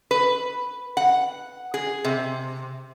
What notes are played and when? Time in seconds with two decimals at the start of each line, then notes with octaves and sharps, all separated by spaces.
0.11 B4
0.97 F#5
1.74 G#4
2.05 C3